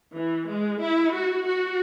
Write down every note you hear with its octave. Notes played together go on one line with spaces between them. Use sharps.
E3
G#3
E4
F#4
F#4